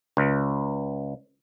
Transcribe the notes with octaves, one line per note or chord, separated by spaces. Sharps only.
C#2